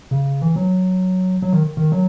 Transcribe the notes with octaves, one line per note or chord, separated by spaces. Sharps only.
C#3
E3
F#3
F#3
D#3
D#3
F#3